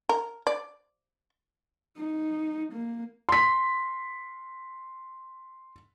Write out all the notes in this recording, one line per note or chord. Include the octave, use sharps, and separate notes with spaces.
A#4
D5
D#4
A#3
C6 B6